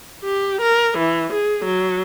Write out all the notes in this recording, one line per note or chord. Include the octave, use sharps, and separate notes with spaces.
G4
A#4
E3
G#4
F#3